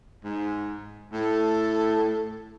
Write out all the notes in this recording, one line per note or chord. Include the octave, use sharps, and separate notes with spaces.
G#2
A2 A4